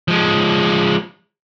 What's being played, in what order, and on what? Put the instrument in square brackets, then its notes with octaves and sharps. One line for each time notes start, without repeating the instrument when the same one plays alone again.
[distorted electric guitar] F3 G#3